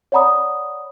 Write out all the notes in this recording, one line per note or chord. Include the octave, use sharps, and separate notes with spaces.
C#5 D5 F#5 A#5 B5 D#6